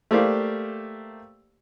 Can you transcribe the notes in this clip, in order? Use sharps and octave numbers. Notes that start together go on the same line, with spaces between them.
A3 A#3 G4 C5 D5 F5